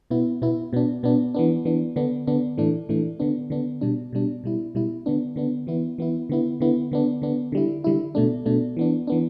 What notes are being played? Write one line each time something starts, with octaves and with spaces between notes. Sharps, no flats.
B2 B3 E4
B2 B3 E4
B2 B3 D4
B2 B3 D4
E3 B3 D4
E3 B3 D4
D3 B3 D4
D3 B3 D4
A2 E3 A3 D4
A2 E3 A3 D4
D3 B3 D4
D3 B3 D4
B2 G3 D4
B2 G3 D4
B2 G3 E4
B2 G3 E4
D3 B3 D4
D3 B3 D4
E3 B3 E4
E3 B3 E4
D3 B3 E4
D3 B3 E4
D3 B3 D4
D3 B3 D4
D3 G3 E4
D3 G3 E4
B2 A3 D4
B2 A3 D4
E3 B3 D4
E3 B3 D4